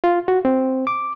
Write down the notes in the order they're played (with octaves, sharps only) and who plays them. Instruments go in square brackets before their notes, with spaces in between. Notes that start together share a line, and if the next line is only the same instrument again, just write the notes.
[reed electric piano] F4
F#4
C4
D6